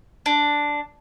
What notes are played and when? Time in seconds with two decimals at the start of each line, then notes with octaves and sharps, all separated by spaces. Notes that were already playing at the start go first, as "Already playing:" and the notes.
0.26 D4